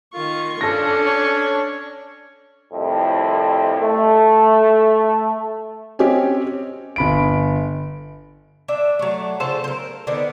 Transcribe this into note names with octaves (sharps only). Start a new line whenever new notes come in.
D#3 F4 C#6
C#4 D4 A4 A#6
C#5
C2 F2 A2
A3
C4 C#4 G4 C#5 D#5 G#5
G1 B5 D7
D4 E5
F#3 A3
C#3 F4 A4 C5
A#4 C5
D3 D#3 B3 C4